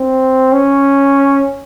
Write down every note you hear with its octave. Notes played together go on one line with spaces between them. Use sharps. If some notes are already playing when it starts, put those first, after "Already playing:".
Already playing: C4
C#4